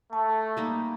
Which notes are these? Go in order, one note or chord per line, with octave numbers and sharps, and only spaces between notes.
A3 A5
G3 A#3 D#4